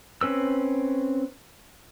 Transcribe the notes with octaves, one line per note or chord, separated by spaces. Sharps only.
C4 C#4 B4 E6